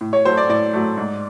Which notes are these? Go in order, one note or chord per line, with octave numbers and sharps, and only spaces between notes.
A2
C#5
F#3 A3 C5
D5
A2 D5
F#3 A3
G#2